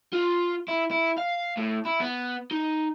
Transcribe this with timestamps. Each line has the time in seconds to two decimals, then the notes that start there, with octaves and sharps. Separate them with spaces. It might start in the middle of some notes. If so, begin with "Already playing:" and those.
0.13 F4
0.68 E4
0.91 E4
1.18 F5
1.58 A2
1.86 E4
2.01 B3
2.51 D#4